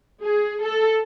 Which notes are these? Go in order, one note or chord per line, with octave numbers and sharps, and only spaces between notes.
G#4
A4